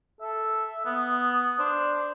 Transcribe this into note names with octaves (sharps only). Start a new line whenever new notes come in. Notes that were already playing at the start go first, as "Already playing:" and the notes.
A4 E5
B3 D#6
D4 C5